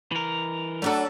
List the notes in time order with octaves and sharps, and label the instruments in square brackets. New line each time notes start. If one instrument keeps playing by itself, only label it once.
[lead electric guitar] E3 A#4
[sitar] F#3 A4 [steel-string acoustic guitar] A3 D4 F#5